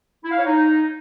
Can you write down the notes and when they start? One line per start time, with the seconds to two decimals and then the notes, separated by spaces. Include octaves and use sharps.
0.24 E4
0.31 F5
0.38 C#5
0.45 D#4